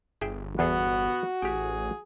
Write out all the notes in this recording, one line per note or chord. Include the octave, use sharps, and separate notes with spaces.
G1 G#4 E5 G5
E2 B3 F#4 G#4 A4
A1 G4 G#4 G5